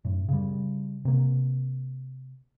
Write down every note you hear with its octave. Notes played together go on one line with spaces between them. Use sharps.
F#2 A2
C#3 G3
C3 A#3